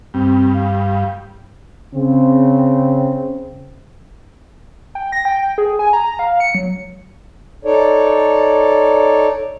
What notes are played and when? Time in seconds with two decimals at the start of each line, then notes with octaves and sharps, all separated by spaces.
0.14 G2 C4
0.54 F5
1.94 C#3 C4
4.95 G5
5.12 A#6
5.25 G5
5.58 G#4
5.79 G#5
5.93 A#5
6.06 A#5
6.19 F5
6.40 C#7
6.55 F#3
7.65 D#4 A4 C#5 D5